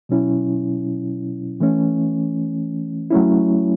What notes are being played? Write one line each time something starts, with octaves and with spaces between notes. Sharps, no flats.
B2 F#3 C#4 E4
E3 A3 C#4
F#3 A3 C#4 E4